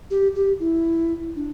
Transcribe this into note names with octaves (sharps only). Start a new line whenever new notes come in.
G4
G4
E4
D4